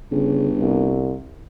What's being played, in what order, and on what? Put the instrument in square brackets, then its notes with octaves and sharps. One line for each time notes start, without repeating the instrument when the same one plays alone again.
[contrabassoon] G1 [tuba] C#3
[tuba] C2